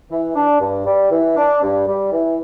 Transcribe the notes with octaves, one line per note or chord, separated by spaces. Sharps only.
E3
D4
G2
G3
E3
D4
G2
G3
E3